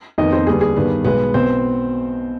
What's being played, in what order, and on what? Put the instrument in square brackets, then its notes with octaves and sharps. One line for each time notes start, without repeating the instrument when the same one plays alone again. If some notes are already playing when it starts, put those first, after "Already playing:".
[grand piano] F2 D#3 B3 D#4 D#5
C4 C5
D#2 D3 G3 B3 G#4
G#4
G2 D#3 G3 B3
B1 B2 G#3 B3 B4
B1 B2 B3 C4 C5